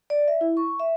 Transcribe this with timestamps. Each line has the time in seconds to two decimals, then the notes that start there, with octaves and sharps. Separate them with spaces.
0.10 D5
0.28 E5
0.41 E4
0.57 C#6
0.80 E5